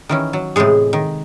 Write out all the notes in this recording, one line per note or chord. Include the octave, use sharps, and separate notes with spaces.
D#3 E3 C#4
F#3
A2 C3 E3 G#3 G#4
D#3